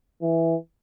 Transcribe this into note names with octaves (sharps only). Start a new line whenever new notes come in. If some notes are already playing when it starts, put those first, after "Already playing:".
E3